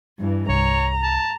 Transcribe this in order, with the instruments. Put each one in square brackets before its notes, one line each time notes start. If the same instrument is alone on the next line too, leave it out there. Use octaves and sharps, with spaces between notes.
[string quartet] G2 E3
[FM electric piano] C2 [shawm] C#5 [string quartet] A#5
[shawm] A5